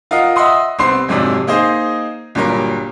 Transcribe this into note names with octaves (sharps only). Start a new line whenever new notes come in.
F4 A#4 D#5 F5 F#5
D#5 E5 F#5 C6 D#6
C2 B3 C4 C6 C7
G1 F2 G#2 C3 F#3 D4
A#3 D#4 G#4 C5 D#5
G1 A#2 F#3 G3 A#4